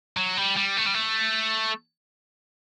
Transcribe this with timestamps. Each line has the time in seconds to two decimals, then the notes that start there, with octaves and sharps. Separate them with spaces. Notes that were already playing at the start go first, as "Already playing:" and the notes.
0.17 F#3
0.37 G3
0.57 G3
0.78 A3
0.86 G3
0.95 A3